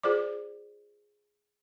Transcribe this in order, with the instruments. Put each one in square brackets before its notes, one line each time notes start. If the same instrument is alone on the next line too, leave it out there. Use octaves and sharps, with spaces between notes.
[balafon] F4 G#4 C5 D5 D6